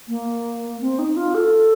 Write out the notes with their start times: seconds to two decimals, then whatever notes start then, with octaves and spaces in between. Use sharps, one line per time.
0.08 A#3
0.81 C4
0.99 D#4
1.17 F4
1.35 A4